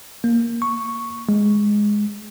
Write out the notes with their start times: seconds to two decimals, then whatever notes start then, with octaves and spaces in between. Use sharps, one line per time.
0.24 A#3
0.62 C#6
1.29 G#3